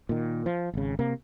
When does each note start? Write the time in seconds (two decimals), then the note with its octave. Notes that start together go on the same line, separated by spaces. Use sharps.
0.09 A#2 D#3
0.46 F3
0.74 G#1 C#3
0.99 C3 A#3